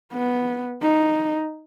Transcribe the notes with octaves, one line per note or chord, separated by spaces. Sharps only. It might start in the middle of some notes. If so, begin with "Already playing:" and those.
B3
D#4